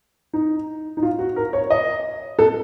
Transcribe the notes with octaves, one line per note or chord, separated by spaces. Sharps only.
D#4
D#4
F4
F#4
A#4
C#5
D#5
A4